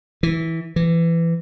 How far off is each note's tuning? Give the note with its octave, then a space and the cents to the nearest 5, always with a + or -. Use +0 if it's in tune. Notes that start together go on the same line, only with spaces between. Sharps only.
E3 -10
E3 +20